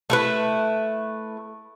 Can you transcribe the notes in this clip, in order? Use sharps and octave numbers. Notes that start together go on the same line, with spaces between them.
A3 E4 B4